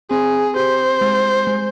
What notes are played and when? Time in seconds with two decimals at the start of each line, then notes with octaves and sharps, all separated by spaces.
0.10 C4 G#4
0.56 G4 C5
1.01 G#3
1.47 G#3